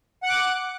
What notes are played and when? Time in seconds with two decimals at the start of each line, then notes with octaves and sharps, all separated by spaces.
0.23 F#5
0.26 F#6
0.29 D6